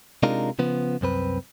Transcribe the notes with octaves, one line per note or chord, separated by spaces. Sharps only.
C3 G#3 D4 D#4 F4 A#4
C#3 F3 B3
C2 F#2 C4 B4